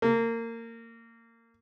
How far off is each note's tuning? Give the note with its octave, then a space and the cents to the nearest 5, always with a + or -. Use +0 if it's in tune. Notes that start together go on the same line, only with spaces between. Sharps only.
A#3 -25